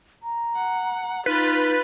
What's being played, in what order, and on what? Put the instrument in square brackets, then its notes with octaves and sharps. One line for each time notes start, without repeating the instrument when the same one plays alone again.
[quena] A#5
[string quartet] F#5
[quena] D#4 [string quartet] F4 G6 A6 [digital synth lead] B4